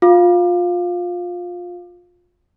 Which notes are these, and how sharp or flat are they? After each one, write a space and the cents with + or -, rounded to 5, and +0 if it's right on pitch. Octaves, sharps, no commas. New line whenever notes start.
F4 +25 F5 +0 D6 +30